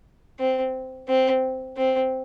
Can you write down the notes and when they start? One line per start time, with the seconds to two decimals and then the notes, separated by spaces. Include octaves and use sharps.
0.40 C4
1.08 C4
1.77 C4